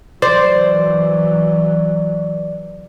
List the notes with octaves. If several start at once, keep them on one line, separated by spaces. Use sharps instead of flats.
E3 F#3 C5 D5